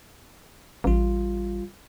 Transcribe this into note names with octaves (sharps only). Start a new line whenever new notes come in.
A1 G3 F4